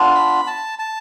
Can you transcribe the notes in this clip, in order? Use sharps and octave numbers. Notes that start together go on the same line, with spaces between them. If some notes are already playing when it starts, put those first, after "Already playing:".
Already playing: B3 D4 F4
B5
A5
A5